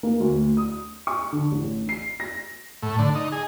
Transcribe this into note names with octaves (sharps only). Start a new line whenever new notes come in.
A#3
D2
D#6
C#6
D3
A1
C7
A#6
A2
D3
D#4
G#4